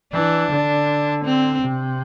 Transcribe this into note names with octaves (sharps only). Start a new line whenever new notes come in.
E3 D4
D3
C4
C3